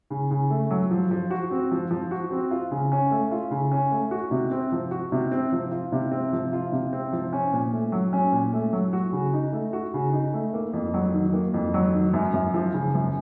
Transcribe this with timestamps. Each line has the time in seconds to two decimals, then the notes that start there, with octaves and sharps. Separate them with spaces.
0.10 C#3
0.31 C#3
0.50 A3
0.70 F#3
0.91 F3
1.11 F3
1.31 F#4
1.51 C4
1.71 F3
1.91 F3
2.11 F#4
2.31 C4
2.51 F4
2.71 C#3
2.92 C#4
3.11 A3
3.31 F4
3.51 C#3
3.72 C#4
3.91 A3
4.11 F#4
4.31 C3
4.51 C4
4.72 F3
4.91 F#4
5.12 C3
5.32 C4
5.52 F3
5.72 F4
5.92 C3
6.12 C4
6.33 F3
6.53 F4
6.72 C3
6.93 C4
7.13 F3
7.33 C#4
7.53 A#2
7.73 A3
7.92 F#3
8.13 C#4
8.32 A#2
8.53 A3
8.73 F#3
8.93 F#4
9.13 C#3
9.33 D#4
9.53 A3
9.73 F#4
9.94 C#3
10.13 D#4
10.34 A3
10.54 A#3
10.73 F2
10.94 F#3
11.13 D#3
11.33 A#3
11.54 F2
11.74 F#3
11.94 D#3
12.13 F#2
12.33 F#2
12.54 F3
12.74 C#3
12.95 F#2